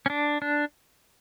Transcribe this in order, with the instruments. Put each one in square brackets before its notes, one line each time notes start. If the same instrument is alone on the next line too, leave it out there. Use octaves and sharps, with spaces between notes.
[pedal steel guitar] C#4
D4
D4